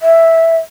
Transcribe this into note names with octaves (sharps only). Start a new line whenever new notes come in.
E5